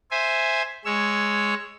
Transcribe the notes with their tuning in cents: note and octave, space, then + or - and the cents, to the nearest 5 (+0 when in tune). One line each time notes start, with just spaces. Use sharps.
C5 +0 E5 +0 G#5 +0
G#3 +0 C#5 +5 E6 +15